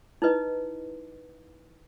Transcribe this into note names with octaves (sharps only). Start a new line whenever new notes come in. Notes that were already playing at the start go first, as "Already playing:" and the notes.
D#4 E4 B4 D#5